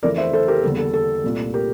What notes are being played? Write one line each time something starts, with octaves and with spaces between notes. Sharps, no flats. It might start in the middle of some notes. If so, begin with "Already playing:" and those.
F2 E3 A3 A#4 D5
C5 E5
A4 C5
G4 A#4
E2 D3 G3 A#3 A4
A4
A4
C2 A#2 A3
G4 A#4